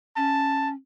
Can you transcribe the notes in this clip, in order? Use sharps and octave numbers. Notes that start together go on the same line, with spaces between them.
C#4 A5